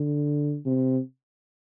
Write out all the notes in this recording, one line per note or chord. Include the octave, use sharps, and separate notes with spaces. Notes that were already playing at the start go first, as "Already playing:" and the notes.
Already playing: D3
C3